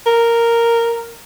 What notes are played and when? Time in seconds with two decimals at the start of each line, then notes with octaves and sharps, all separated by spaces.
0.06 A#4